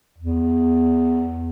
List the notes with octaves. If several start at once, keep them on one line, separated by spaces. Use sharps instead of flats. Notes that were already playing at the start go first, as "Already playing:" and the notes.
E2